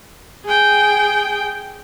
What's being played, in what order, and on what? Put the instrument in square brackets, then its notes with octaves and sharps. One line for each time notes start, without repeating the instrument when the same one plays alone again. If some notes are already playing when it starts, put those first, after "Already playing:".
[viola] G#4 G5